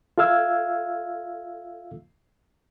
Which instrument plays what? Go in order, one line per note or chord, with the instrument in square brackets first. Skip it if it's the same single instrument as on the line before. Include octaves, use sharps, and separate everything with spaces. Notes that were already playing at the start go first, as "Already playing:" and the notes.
[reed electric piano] F4 A4 E5 F5 E6 G#6